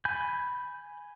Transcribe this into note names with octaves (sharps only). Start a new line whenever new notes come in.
G#5 B5 G6